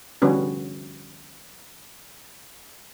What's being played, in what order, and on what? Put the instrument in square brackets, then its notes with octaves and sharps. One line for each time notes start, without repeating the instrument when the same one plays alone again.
[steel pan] D3 F3 G3 B3 C#4 F#4